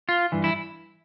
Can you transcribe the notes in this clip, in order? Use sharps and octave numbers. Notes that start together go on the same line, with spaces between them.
F4
G2 E3
E4